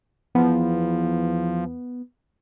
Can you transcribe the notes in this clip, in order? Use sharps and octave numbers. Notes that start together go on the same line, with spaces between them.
E2 F3 B3